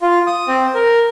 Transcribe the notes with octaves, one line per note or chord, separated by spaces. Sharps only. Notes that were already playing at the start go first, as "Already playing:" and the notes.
F4
D#6
C4
A#4